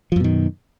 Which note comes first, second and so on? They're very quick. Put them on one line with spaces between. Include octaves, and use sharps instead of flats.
F3 F#2 B2 D#3